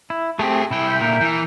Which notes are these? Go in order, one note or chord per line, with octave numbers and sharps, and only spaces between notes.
E4
A3 C4 G4 G#4
C2 E4 G5
E5 G6
A#2 D3 A#4
E3